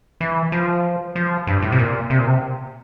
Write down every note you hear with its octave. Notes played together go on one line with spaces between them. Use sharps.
E3
F3
F3
G2
A2
C3
A#2
C3
A#2
C3